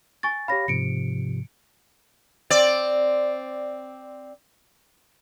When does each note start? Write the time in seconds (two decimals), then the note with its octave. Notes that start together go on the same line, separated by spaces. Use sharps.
0.23 G#5 C#6 A6
0.48 G4 C#5 F5 B5 A#6
0.68 G#2 C3 F3 C#7 D7
2.50 C4 D5